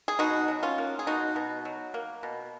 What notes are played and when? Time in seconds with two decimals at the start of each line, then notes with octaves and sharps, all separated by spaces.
0.08 G#4
0.19 B2 D#4 F#4
0.48 F#3
0.63 C#4 F4
0.78 A#3
0.99 G#4
1.06 B2 D#4 F#4
1.36 B2
1.65 F#3
1.94 A#3
2.23 B2